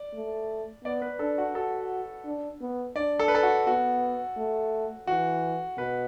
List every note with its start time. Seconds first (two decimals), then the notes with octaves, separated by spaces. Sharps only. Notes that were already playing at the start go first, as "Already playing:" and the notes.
Already playing: D5
0.14 A3
0.84 B3 D5
1.02 B4
1.19 D4 A4
1.38 F#4
1.55 F#4 A4
2.25 D4
2.61 B3
2.96 D4 D5
3.19 A4
3.28 B4
3.35 A4
3.43 F#4
3.67 B3 F#4
4.37 A3
5.07 E3 F#4
5.77 B2 B4